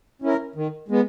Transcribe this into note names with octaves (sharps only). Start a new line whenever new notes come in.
C#4 E4 A#4
D#3
G#3 B3